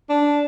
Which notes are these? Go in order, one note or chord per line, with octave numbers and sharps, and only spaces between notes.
D4